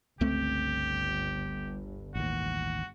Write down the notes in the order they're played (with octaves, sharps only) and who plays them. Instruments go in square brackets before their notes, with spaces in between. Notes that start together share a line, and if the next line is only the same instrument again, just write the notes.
[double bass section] G1 [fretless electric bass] C#2 A3 C4 [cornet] G4
[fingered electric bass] A1 D#2 [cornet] F#4